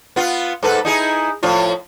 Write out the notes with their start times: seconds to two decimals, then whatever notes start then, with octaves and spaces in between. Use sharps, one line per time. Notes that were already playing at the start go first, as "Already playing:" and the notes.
0.16 B3 F4
0.63 G#2 A4 B4
0.85 D#4 E4 G#4
1.43 A2 F3 F4